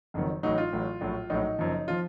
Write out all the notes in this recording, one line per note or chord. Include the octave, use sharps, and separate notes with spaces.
F#1 F2 D#3 F#3
A1 A2 F#3 D#4
F4
A1 A2 F#3
A#1 A2 F#3
A#1 A2 F#3 D#4
F#1 F#2 F3
F3 F4